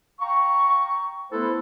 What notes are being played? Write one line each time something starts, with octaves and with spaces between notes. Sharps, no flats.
F5 G5 A#5 C#6
A3 B3 E4 A4 B4 C5